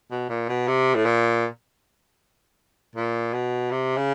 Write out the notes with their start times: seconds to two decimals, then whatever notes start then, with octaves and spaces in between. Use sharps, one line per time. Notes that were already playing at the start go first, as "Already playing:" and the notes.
0.11 B2
0.29 A#2
0.49 B2
0.67 C3
0.95 A2
1.06 A#2
2.96 A#2
3.33 B2
3.71 C3
3.97 C#3